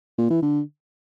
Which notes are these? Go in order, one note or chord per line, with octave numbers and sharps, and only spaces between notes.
A#2
E3
D3